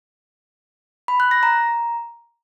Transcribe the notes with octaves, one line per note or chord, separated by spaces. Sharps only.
B5
F#6
A#6
A#5